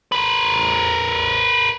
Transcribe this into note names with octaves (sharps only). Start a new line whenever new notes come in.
A#4 B4